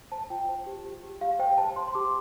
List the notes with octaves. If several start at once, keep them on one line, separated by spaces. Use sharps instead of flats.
C5 A5
F4 G5
C5
G4
G4
G4
G4 F5
C5 G5
C5 A5
C5 C6
C6
G4 D6